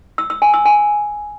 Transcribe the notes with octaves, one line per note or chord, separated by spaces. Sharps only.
E6
E6
G#5
E6
G#5